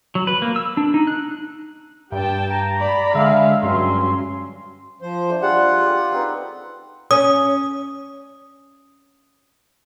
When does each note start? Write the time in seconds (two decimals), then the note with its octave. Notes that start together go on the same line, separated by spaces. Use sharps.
0.15 F#3
0.27 B4
0.42 A#3
0.56 E6
0.77 D4
0.94 D#4
1.07 F#6
2.12 G2 G4 G5 A5
2.50 A#5
2.80 D5 B5
3.15 D3 G#3 E5 F5
3.63 G2 F#3 C#4 C6
5.02 F3 C5
5.30 A3 D4
5.42 G3 G#3 F4 F#5
5.86 G4 A4
6.12 C4 D#4 B4
7.11 C#4 D#6